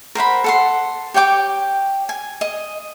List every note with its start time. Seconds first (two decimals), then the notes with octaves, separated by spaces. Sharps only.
0.15 A#4 C5 F#5 B5
0.44 A4 F#5 C6
1.14 G4 C#5 G5 D6
2.09 G#5
2.41 D#5